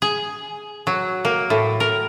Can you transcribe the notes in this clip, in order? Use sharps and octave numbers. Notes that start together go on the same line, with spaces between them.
G#4
F#3
A#3
A2
A#4